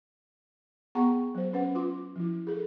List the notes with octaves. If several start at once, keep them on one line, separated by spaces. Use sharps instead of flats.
B3 G#4 F#5 G5 A#5 C#6
F#3 C5
C#4 B4 F#5
F4 C6 D6
F3 E4
G#4 A4